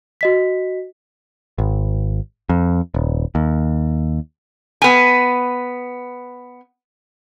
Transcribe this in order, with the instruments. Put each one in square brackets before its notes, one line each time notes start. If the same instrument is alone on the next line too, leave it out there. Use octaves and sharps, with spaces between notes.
[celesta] F#4 D#5 B6
[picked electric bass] G#1
F2
D#1
D#2
[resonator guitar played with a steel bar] B3 G#5